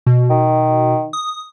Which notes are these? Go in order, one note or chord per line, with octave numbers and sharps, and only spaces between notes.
B2
D#3
D#6